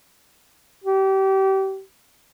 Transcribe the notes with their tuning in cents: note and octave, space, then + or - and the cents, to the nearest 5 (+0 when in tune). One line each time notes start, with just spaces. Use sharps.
G4 -30